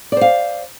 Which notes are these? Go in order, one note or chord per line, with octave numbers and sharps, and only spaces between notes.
C5 D5 F5